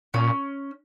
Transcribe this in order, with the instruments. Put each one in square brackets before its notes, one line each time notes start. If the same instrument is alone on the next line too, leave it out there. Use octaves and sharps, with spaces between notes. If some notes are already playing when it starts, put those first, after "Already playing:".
[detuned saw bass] A#2 [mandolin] C#4